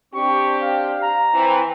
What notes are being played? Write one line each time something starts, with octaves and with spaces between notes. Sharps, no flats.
C4 D4 G4 C#6
F5
A#5
E3 C4